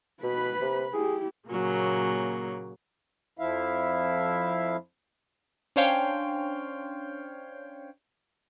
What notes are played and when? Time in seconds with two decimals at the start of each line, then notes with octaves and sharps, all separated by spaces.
0.23 B2 B4 B5
0.62 C3
0.93 E4 G4 G#4
1.48 A#2 C#3 F#3 A#3
3.39 F2 F3 E4 E5 F5
5.76 C#4 D4 C5 C#5 F5 G5